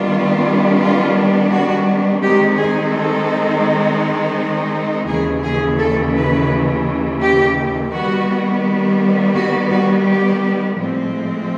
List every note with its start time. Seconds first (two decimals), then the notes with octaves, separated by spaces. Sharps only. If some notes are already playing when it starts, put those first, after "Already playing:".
Already playing: D#3 G3 B3 D4 F4
0.79 F4
1.51 F#4
2.22 D#3 G#3 C4 D#4 G4
2.57 G#4
2.93 A4
5.06 D#2 C#3 E3 G#4
5.43 G#4
5.78 A4
6.14 B4
7.20 G4
7.92 D#3 G3 B3 F#4
9.35 F#4
9.70 F#4
10.06 G4
10.77 A2 F3 G#3 C4